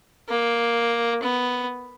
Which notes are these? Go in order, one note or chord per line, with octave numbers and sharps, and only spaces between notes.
A#3
B3